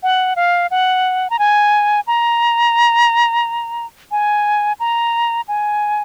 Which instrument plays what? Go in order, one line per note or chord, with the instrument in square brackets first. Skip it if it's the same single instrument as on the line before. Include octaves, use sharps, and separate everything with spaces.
[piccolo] F#5
F5
F#5
A#5
G#5
A#5
G#5
A#5
G#5